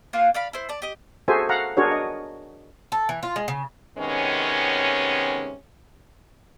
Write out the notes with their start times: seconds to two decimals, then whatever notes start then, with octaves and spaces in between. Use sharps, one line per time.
0.13 A#3 F4 F5 F#5
0.34 D5 F5 B5
0.53 E4 C5
0.69 D5 A5
0.82 G4 D#5
1.28 F#4 G#4 A4 C5 E5 G#5
1.49 F5 F#5 A#5
1.77 D4 F#4 G#4 A#4 C#5
1.92 D#5
2.92 A4
3.09 E3
3.23 F4
3.36 G#3
3.48 C#3
3.97 C3 D#3 G#3 B3 C#4